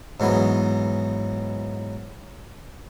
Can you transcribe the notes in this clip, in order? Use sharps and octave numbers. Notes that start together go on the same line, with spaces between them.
G#2 E3 F#3 B3